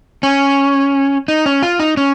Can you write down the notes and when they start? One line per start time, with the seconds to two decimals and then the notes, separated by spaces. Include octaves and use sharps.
0.23 C#4
1.28 D#4
1.46 C#4
1.63 F4
1.79 D#4
1.97 C#4